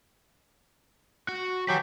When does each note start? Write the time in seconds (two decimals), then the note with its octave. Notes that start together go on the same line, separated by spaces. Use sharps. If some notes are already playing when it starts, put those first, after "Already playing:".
1.29 F#4
1.68 F#3 G4 B4 G5 G#5